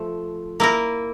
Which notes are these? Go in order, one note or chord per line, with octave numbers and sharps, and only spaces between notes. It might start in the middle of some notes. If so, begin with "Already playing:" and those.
Already playing: F3 A3
A#3 E4 A#4